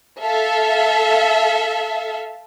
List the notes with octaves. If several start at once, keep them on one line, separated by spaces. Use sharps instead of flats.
A4 E5 F5